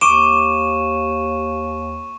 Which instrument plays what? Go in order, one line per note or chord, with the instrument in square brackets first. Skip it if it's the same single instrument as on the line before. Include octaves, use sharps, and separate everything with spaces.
[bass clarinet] D#2 [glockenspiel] C#6 D#7 E7 [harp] D6